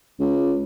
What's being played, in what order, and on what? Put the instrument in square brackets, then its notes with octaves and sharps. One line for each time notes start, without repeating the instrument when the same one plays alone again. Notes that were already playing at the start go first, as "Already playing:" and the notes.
[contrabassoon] C#2